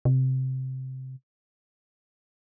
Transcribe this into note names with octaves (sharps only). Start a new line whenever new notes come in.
C3